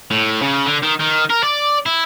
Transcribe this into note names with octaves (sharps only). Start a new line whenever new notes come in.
A2
C#3
D3
D#3
D#3
A#4
D5
E4